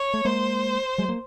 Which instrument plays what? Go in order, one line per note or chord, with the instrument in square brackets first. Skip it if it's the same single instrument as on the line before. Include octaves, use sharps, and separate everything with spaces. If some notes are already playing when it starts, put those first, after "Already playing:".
Already playing: [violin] C#5
[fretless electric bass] A3
[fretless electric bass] G#3 A#3 [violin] C5
[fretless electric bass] F#3 G#3
A#3